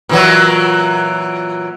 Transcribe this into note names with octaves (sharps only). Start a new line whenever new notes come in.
A#2 E3 F#3